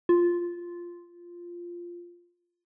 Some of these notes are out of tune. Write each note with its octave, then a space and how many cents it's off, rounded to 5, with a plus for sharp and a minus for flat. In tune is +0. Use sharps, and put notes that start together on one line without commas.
F4 -5